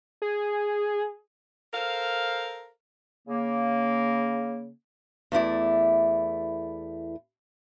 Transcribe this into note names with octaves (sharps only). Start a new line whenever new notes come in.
G#4
A4 A#4 C5 F5
C#3 A#3
E2 A3 E4 D5